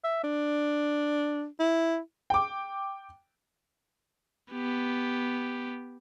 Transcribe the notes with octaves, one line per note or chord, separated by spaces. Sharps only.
E5
D4
E4
G5 D6
B3 G4